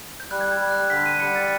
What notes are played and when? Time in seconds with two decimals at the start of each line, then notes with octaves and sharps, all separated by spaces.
0.20 G6
0.30 G3 F#6
0.41 G#6
0.51 G6
0.60 G3
0.70 F#6
0.90 D3 B6
1.06 D#7
1.20 G3 C#7
1.36 A6